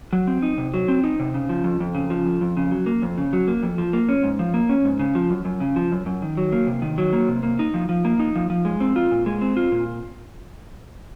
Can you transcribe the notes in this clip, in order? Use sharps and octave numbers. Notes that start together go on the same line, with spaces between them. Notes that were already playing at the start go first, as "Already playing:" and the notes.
F#3
C4
D#4
C3
F#3
C4
D#4
C3
C#3
F3
F2
F2
C#3
F3
F2
F2
C#3
F#3
A#3
F2
C#3
F#3
A#3
F2
F3
A#3
C#4
G#2
F3
A#3
C#4
G#2
C#3
F3
F#2
F#2
C#3
F3
F#2
F#2
D#3
F#3
A#3
C3
D#3
F#3
A#3
C3
A#3
D#4
F3
F3
A#3
D#4
F3
F3
G#3
C4
F4
A#2
G#3
C4
F4
A#2